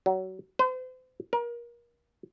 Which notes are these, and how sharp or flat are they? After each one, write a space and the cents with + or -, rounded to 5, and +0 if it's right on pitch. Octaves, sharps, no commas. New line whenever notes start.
F#3 +25
C5 -40
A#4 +30